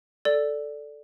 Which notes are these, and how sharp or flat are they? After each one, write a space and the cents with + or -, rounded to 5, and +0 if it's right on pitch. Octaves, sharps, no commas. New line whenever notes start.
A4 +0 D5 +0